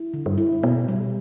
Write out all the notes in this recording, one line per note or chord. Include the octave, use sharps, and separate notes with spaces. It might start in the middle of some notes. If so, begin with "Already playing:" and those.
Already playing: E4
D3
G2
E4
B2 B3
G3